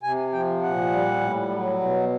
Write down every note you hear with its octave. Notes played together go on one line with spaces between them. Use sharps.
C3 G#5
F3 G5
A#2 F#5
G3
A2
F#3
B2